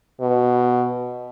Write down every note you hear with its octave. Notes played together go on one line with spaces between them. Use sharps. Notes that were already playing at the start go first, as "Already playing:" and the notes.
B2